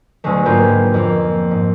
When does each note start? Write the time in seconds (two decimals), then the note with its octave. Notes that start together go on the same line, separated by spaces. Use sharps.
0.24 D2 B2 D3 F#3 G#3 A3
0.45 G#2 A#3 F4 B4 G5
0.94 F2 A#3
1.51 G#2